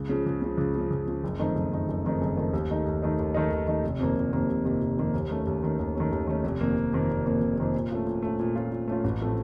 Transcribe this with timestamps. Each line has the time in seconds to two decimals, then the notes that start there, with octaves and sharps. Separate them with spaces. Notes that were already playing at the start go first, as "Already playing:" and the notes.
Already playing: C#2
0.09 C#3 F3
0.26 C#2
0.42 C#3 F3
0.58 C#2
0.75 C#3 F3
0.90 C#2
1.08 C#3 F3
1.24 F#1
1.39 F2 D#3 A3 D#4
1.55 F#1
1.72 F2 D#3 A3 D#4
1.89 F#1
2.05 F2 D#3 A3 D#4
2.21 F#1
2.37 F2 D#3 A3 D#4
2.53 D#2
2.70 D#3 A3 D#4
2.85 D#2
3.02 D#3 A3 D#4
3.19 D#2
3.34 D#3 A3 D#4
3.51 D#2
3.67 D#3 A3 D#4
3.83 F1
3.99 F2 C3 D#3 A#3
4.17 F1
4.33 F2 C3 D#3 A#3
4.49 F1
4.65 F2 C3 D#3 A#3
4.82 F1
4.98 F2 C3 D#3 A#3
5.14 D#2
5.30 D#3 A3 C#4
5.47 D#2
5.63 D#3 A3 C#4
5.79 D#2
5.95 D#3 A3 C#4
6.11 D#2
6.27 D#3 A3 C#4
6.44 F1
6.61 F2 D#3 A#3
6.76 F1
6.93 F2 D#3 A#3
7.09 F1
7.25 F2 D#3 A#3
7.41 F1
7.58 F2 D#3 A#3
7.74 A#2
7.91 A3 C#4 F4
8.06 A#2
8.22 A3 C#4 F4
8.39 A#2
8.56 A3 C#4 F4
8.72 A#2
8.88 A3 C#4 F4
9.04 A1
9.21 A2 F3 A3 C4